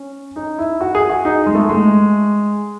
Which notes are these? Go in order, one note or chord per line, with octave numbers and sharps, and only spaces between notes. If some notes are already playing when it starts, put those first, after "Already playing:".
Already playing: C#4
D#4
E4
F#4
G#4
F#4
D#4
G#3
A3
G#3